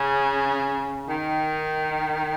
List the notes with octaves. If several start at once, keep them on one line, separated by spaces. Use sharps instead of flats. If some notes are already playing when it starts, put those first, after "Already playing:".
Already playing: C#3
D#3